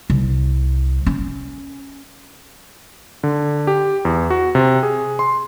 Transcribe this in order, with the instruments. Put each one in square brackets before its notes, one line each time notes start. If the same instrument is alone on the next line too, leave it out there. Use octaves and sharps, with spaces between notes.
[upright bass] C2
C#4
[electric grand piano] D3
G4
E2
F#4
C3
G#4
C6